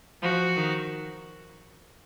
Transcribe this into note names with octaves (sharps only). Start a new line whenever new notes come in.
F3 F#4
D#3